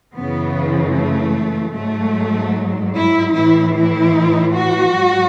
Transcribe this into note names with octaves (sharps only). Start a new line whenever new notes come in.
F#2 C#3 E3 B3
A3
G#2 F#3 A3
E4
A2 E3 E4
E4
F#4
G#2 F#3